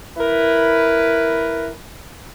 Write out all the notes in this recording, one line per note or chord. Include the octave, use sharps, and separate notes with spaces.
E4 A#4 B4